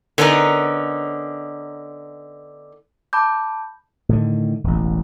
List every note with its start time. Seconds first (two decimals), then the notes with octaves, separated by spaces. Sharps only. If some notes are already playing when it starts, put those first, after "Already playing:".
0.18 D3 B3 C#4 D#4 A#4
3.13 A5 B5 D6 G6
4.09 A2 D3 D#3
4.64 E1 A1